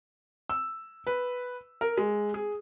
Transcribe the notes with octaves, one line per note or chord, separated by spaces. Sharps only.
E6
B4
A#4
G#3
G#4